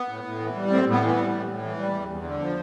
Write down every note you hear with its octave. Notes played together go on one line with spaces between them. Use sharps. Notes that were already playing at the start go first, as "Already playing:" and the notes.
Already playing: B3
A2
A2
E3
G3
A2 C4
A2
B3
E3
B3
G3
A2
A2
E3
G3
E2
E2
D3
F3